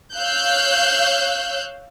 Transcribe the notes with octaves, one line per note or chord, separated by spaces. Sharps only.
C#5 F5 E6 F#6 G6